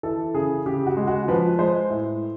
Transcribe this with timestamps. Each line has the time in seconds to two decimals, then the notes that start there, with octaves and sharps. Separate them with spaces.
0.03 E3 A4
0.34 C#3 G#4
0.66 C#3 G4
0.87 F#4
0.97 G#3
1.07 F#4
1.28 F3 B4
1.59 G#3 C5
1.90 A2